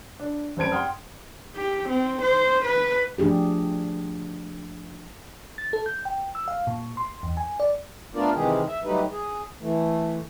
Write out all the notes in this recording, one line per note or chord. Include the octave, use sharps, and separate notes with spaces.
D4
F1 F#2 C5 A5 G#6 D7
F#5 G5 C6 D#6 F6
G4
C4
C5
B4
F3 A3 D4 G4 G#4
A6
A4
G6
G5
E6
F5
A#2
C6
E2
G#5
D5
A3 B3 D4 F4 A#4 D5
C3 D#3 E3 G#3 G4 G#4
E5
F#3 G3 A3 D#4 G4 B4
G#4
E3 A3